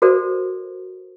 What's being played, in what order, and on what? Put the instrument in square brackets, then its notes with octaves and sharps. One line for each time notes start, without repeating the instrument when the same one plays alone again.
[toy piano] F#4 A4 A#4 C5 D5